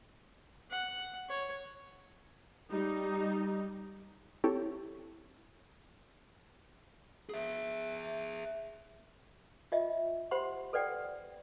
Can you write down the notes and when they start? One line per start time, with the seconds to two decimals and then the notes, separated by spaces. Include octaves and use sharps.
0.71 F#5
1.29 C#5
2.70 G3 D#4
4.44 C4 E4 G4 A4 C#5
7.29 G#4 E5
9.72 F4 D#5 E5
10.31 G4 C5 F#5 B5 C6
10.73 A4 B4 D5 F#5 G5